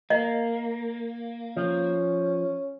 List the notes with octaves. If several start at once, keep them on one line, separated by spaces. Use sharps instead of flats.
A#3 D#5
F3 C#4